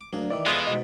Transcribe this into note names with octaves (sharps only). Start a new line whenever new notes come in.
D6
D2 F#3 A#3 D4 G#4
D#3 E3 D5 E5 D6
F2 E3 F3 G#3 B3 F4 C5
G#2 B2 D#5